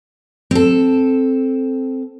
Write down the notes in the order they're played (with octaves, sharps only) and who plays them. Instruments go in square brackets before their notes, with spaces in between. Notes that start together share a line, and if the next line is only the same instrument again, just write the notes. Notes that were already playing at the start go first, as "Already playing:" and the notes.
[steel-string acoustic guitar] C4 A4